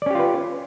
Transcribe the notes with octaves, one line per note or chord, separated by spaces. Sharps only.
C#4 F4 G4 B4 D5